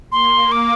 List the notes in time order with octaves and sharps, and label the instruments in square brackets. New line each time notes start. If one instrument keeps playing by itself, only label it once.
[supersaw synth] A#3 [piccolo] C6
[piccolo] D6